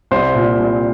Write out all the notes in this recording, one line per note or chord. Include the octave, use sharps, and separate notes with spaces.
C2 C5
A#2
C2